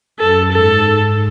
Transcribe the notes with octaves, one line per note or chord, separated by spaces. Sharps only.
F#2 A4
G#2 A4